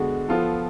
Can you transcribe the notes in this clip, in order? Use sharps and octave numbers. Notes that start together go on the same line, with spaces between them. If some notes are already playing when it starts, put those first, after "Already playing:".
Already playing: D3 G#3 B3 F#4
F3 B3 F4 A4